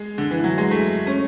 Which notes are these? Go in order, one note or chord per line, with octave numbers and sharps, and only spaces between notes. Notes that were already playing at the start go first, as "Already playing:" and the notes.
Already playing: G#3
D3
E3
F#3
G#3
A3
C#4